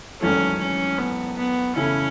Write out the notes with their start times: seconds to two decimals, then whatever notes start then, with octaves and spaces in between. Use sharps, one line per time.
0.21 G#1 F#2 E3 A3 C#4
0.60 C#4
0.98 B3
1.37 B3
1.76 C#3 E3 A3 C#4 E4